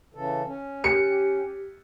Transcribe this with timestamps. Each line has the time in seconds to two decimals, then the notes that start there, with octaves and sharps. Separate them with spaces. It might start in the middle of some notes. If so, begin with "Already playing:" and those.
0.14 C#3 E3 A4
0.47 C#4
0.84 G4 C#7